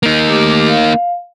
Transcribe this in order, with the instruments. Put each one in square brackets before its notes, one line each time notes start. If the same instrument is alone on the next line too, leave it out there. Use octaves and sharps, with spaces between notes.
[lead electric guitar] A#3 D#4
[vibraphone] A3 G4 D6
F5